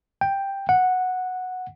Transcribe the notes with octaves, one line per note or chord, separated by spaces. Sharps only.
G5
F#5